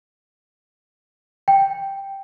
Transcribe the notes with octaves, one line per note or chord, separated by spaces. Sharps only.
G5